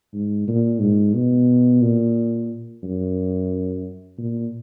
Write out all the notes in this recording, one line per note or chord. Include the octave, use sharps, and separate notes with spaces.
G#2
A#2
G#2
B2
A#2
F#2
A#2